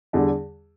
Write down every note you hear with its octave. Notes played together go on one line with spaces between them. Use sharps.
E2 D3 G3